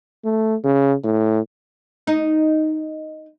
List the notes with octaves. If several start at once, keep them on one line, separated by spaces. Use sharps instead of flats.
A3
C#3
A2
D#4